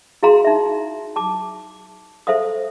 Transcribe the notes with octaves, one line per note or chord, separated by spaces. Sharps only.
E4 F#4 G#4 F5 A#5 C6
D#4 E5
A5 D6
A4 C5 E5 F5 D#6